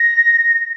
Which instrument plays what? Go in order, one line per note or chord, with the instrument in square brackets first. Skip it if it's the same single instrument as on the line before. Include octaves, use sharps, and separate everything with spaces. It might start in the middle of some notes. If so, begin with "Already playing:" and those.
Already playing: [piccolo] A#6